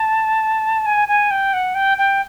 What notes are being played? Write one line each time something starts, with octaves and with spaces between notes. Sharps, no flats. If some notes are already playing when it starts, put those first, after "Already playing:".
Already playing: A5
G#5
G#5
G5
F#5
G5
G5